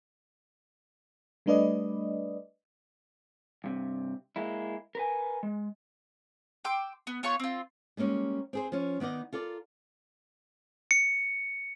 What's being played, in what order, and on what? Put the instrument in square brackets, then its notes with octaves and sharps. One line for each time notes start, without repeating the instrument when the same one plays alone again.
[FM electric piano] G3 A3 D4 B4 D5 D#5
[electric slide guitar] G2 C3
G#3 A#3 E4
A#4 B4 G#5
G#3
[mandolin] G5 C6 D6 E6
B3
B3 F4 C#5 C#6
C4 F4
[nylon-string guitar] G3 G#3 A#3 C#4 G4
C4 G#4 C5
F3 C#4
D#3 B3 D#4 D5 D#5
F4 A4 A#4 D5
[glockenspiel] C#7